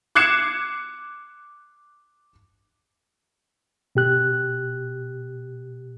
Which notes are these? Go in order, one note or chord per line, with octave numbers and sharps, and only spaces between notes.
D6 F#6 G#6 C7 C#7 E7
B2 G4 F#6